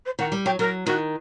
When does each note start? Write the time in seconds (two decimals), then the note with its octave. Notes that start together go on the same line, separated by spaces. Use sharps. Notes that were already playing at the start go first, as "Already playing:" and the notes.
0.05 C5
0.19 D#3 F#5
0.32 G3
0.46 F#3 G5
0.59 F#3 A#4
0.86 D#3 F#4